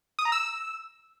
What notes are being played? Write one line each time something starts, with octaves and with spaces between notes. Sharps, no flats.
D#6
A#5
E6